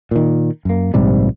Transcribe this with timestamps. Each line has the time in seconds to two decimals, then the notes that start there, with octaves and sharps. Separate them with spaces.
0.11 A#2 D#3
0.65 F#2 A#3
0.94 A#1 G#2 C3 G3